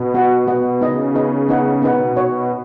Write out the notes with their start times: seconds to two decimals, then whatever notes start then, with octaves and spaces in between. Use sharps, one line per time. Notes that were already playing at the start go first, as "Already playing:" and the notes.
Already playing: B2
0.14 B3 F#4 B4 D#5 F#5
0.47 B2 B3 F#4 B4 D#5 F#5
0.81 C#3 B3 D#4 B4 D#5
1.15 B3 D#4 B4 D#5
1.49 B3 D#4 B4 F#5
1.82 B2 B3 D#4 B4 F#5
2.16 B2 F#4 C#5 F#5